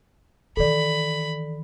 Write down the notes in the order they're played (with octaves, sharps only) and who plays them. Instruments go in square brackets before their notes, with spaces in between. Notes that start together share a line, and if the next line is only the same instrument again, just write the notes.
[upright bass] D#3 E3 [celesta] A4 D5 [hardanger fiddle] B5